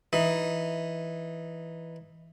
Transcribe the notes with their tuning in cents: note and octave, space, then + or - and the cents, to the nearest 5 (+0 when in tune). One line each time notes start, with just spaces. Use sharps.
E3 +0 D#4 +0